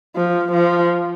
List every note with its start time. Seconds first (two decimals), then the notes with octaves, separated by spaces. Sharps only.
0.16 F3
0.52 F3